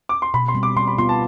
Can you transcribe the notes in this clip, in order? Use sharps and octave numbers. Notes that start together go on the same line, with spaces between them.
D6
C6
B2 B5
C6
G3 C4
D6
G3 C6
B5
B3 F4 C6
A5